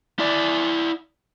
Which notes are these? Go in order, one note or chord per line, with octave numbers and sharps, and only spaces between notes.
E4 D5